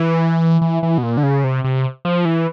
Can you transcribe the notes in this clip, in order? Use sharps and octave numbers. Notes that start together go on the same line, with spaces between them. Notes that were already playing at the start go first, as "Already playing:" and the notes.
Already playing: E3
E3
E3
B2
A#2
D3
C#3
C3
C3
F3
E3